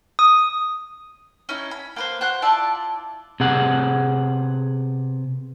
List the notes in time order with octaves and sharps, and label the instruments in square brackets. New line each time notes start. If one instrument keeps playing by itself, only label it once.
[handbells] D#6
[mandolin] C#4 D#4 E4
B5
A#3 B4 C5
F#4 C5 F#6
E4 F4 D5 A5
[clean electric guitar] C3 B3 G#4 F#5